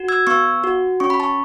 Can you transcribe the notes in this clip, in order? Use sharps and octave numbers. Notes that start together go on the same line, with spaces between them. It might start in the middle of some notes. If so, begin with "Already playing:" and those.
Already playing: F#4
E6 G#6
B3 C#6 E6
F#4
C#4 C#6
B5
A5 C#6